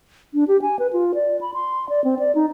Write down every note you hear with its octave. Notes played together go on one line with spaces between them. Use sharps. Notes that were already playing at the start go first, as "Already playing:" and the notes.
D4
G4
G#5
B4
F4
D5
B5
C6
D5
C4
D5
D#4